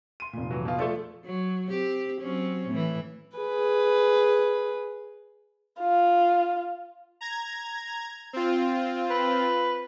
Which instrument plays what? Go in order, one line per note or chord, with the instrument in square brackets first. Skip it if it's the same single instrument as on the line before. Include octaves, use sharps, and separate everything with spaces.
[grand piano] C6 D#7
[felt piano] F1 A#2
[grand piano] E3 F#3
B2 F4
[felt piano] F3 F4 [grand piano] A3 A4 D5
[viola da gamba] F#3
C4 G4
F#3 C4 C#4
A2 E3
[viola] G#4 B4
[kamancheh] F4
[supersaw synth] A#5 G#6
C4 F4
[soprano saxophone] B4